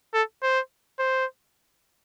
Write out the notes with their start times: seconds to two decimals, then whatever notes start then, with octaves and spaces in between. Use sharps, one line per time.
0.14 A4
0.43 C5
0.99 C5